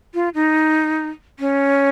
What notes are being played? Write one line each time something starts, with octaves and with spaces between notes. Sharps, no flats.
F4
D#4
C#4